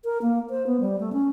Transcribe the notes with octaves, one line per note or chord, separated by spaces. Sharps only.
A#4
A#3
C5
B3
G3
A3
C#4